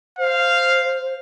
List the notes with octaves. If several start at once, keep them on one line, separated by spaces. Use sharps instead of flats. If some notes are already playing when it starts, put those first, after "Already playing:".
C5 F5